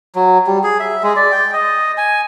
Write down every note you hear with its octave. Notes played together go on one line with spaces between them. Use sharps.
F#3
G3
G#4
E5
G#3
D5
G5
D#5
G#5